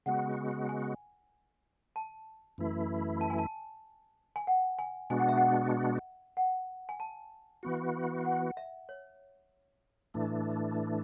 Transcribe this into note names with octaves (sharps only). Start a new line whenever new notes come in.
C#3 G#3 B3 F#4 F#5
G#5
A5
F#2 E3 A3 E4
A5
G#5
A5
G#5
F#5
G#5
B2 G#3 B3 D4 F#4 G#5
F#5
E5
F#5
F#5
G#5
A5
E3 B3 F#4
F#5
E5
C#5
A2 E3 A3 D4